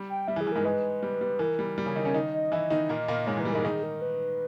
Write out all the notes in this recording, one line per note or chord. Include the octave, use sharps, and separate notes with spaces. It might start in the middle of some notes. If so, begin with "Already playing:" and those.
Already playing: G3
G5
G3 E5
E3
G#4
E3
G#2 G#3 A#4
G#2 G#3 B4
G3
G3
E3 A#4
G3
G3
C#3 C#4
D#3 D#4
C#3 C#4
D#3 D#4
D#5
E3 E4
D#3 D#4
A#2 A#3
A#2 A#3
G#2 G#3 C#5
E3
B4
G3
G#2 G#3 A#4
D#3 D#4 G#4
A#4
B4